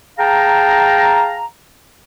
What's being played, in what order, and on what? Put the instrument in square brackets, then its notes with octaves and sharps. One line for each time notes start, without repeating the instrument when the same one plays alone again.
[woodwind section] G#4 F5 G5 A5 A#5